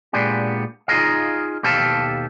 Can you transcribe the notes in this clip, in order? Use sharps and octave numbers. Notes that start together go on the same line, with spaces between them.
A#2 G#3 B3 D4 G4
D#4 F4 F#4 G#4 D#5 F5
D#2 B2 G4 A4 F5 A5